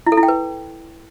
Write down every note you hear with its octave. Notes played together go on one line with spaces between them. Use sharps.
E4
A4
E4
G5
B4